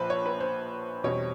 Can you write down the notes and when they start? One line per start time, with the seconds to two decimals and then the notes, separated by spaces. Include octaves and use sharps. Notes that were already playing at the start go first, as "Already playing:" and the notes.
Already playing: A#1 A#2 F3 B4 C5
0.10 C#5
0.26 B4
0.40 C5
1.04 E2 B2 G3 C4 C#5